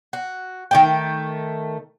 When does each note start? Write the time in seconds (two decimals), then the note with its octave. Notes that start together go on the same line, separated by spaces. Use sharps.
0.13 F#4
0.71 D#3 A3 G5